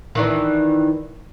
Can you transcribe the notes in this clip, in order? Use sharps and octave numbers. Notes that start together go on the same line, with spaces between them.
D#3 E3 D4